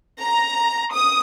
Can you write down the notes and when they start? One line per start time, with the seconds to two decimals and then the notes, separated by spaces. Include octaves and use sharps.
0.18 A#5
0.92 D#6